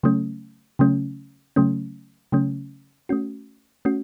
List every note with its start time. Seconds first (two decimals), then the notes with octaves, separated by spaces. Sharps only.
0.03 C#3 F#3 A3 C#4
0.79 C#3 F#3 A3 C#4
1.56 C#3 F#3 A3 C#4
2.32 C#3 F#3 A3 C#4
3.09 A3 C#4 F#4
3.85 A3 C#4 F#4